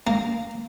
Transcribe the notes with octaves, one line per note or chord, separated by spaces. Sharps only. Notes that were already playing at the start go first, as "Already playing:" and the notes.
A#3